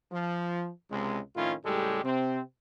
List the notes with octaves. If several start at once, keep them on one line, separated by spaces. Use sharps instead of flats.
F3
C#2 C3 G#3
F2 A2 D#3 C#4 E4 F4
C#2 A2 G3 G#3 G4 A4
C3 C4